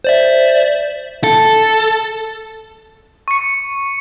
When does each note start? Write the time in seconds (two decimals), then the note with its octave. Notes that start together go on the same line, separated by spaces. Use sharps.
0.04 C5 D5 E5
1.24 A4
3.28 C#6 C#7